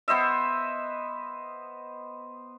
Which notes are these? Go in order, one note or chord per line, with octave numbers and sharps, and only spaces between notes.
B3 C5 D#5 E5